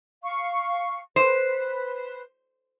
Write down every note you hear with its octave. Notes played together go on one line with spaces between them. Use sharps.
F5 C#6
B4 C5